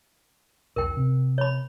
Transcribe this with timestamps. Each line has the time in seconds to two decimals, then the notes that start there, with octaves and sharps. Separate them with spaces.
0.76 E1 B1 A#4 G5
0.97 C3
1.38 C#5 B5